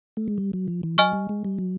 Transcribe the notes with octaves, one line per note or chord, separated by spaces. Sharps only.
A3
G#3
G3
F#3
F3
E3
F#3 D#5 G#5 C#6 F6
G3
G#3
G3
F#3